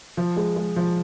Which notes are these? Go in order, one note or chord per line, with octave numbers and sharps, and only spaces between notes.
F3
G#3
G#3
F3